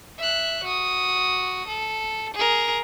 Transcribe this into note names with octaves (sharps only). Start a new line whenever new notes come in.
E5 F#6
F#4 D#6
A4
G#4 A#4